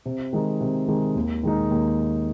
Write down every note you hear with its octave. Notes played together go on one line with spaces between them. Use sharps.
C3
D#3 G#3 D#4
C3
D#3 G#3 D#4
D#2
D#3 G#3 D#4
D#2